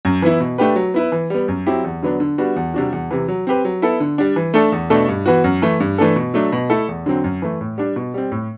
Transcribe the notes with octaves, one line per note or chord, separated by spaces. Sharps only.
F#2
E3 B3 E4
B2
A3 D4 G4 B4
F#3
B3 E4 B4
E3
G3 B3
F#2
F#3 C4 E4 G4
E2
D3 F#3 B3 D4
D3
G3 B3 D4 F#4
E2
C3 G3 D4 F#4
E2
C3 E3
F#3
C4 G4 B4
F#3
B3 E4 A4
D3
G3 D4
E3
A3 D4 A4
E2
B2 A3 D4 A4
G2
E3 B3 F#4
F#2
E3 A3
G2
E3 A3 D4 A4
B2
F#3 A3 D4
B2
A3 E4 A4
E2
D3 F#3 C4
F#2
E3 A3
A2
G3 D4
B2
G3 C4
A2